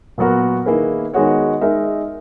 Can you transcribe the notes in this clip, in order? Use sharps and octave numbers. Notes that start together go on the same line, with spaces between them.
A#2 F#3 B3 F#4 A#4
D#3 A#3 E4 G#4 B4
D#3 G#3 B3 F#4 C#5
G#3 D#4 A#4 E5